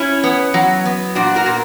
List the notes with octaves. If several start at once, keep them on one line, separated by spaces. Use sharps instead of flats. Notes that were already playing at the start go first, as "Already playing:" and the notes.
Already playing: C#4 E4
B3
F#3
B3
A#2 D4 F#4
F#4 A#4
A#2